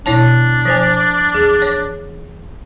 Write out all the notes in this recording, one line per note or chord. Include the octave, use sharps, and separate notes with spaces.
B2 D#3 D4 E4 C#5 A5
F3 C5 G#5
E2 G#4
C#5